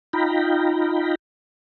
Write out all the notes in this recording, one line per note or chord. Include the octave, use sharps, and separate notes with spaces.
D#4 F4 G5 A#5 B5